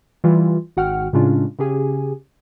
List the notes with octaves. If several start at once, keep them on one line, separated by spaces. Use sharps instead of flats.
E3 G3 F4
G#1 F#4 F#5 G5 F6
A2 C#3 G#3 C#4 D4 F4
C#3 C#4 G4 G#4 G#5